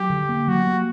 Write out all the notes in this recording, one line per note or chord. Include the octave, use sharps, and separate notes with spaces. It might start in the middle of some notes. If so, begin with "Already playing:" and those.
Already playing: F#3 G4
D3
A#3
F#3 F#4
A#3